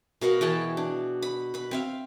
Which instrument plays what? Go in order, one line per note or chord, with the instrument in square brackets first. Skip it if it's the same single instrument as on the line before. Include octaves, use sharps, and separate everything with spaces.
[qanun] B2 A#4 F5 F#5
E3 G#4 G5 A5
D4
B5
B4 B5
C4 E5 F5